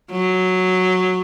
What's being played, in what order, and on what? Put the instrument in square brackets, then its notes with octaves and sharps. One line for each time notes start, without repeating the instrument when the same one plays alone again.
[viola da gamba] F#3